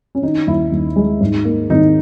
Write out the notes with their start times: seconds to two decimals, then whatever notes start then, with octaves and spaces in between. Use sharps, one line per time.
0.15 C#4
0.22 D#3 D#4
0.47 D#2 E4
0.72 D#2
0.96 G#3
1.20 G#2
1.45 A#3
1.70 G#1 D#4